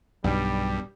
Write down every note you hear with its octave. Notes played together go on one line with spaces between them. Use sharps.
B1 G2 B2 G3